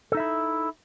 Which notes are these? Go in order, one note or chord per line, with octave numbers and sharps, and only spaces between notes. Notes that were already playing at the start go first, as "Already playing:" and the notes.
D#4 E4 A4 E5